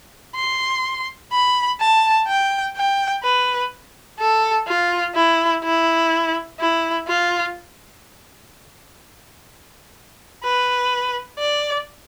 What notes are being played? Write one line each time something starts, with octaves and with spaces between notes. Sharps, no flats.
C6
B5
A5
G5
G5
B4
A4
F4
E4
E4
E4
F4
B4
D5